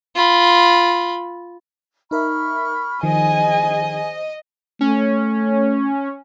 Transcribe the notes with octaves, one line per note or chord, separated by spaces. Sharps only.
F4 B5
D#4 A#4 E5 B5 C#6 F6
D#3 F3 G#4 C5 D#5 G#5
A3 C#4